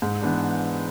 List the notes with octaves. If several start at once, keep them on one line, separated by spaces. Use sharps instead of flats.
G#2
E3 B3 D4